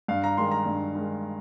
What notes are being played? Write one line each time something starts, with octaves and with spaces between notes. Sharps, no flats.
G2 F5
A#5
D#3 G#3 C6
A#5
G2
D#3 G#3